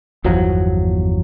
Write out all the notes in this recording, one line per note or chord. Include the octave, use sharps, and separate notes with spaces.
G1 E2 F3 F#3